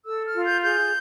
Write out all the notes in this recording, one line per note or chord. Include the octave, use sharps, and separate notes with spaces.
A4 E6
F6
F4
G6
G#4 G6